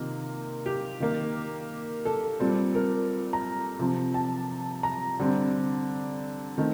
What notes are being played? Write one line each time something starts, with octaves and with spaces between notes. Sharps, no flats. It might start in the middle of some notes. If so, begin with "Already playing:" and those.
Already playing: C3 D#3 A#3 F4
G4
D#3 A#3
A4
A#2 G3 C4
A#4
A#5
C3 F3 C4
A5
A#5
D3 G3 C4
D#3 A3 C4